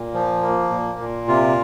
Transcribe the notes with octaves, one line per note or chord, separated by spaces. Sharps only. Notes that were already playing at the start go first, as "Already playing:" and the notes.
Already playing: A#2
F3
A#3
A#2
A#2
C3 F4